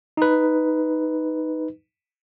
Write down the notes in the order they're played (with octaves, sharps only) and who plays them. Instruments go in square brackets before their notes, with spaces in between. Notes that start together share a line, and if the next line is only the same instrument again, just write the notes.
[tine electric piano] D#4 B4